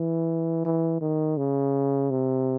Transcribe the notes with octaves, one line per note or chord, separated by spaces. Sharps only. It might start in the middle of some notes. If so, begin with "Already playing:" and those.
Already playing: E3
E3
D#3
C#3
C3